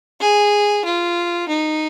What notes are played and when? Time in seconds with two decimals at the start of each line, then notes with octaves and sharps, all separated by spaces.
0.21 G#4
0.84 F4
1.48 D#4